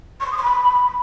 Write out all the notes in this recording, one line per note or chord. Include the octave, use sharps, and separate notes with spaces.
C#6
C6
D#6
C6
B5